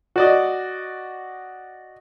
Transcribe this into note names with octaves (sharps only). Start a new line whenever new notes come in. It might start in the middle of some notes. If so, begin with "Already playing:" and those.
F#4 D5 D#5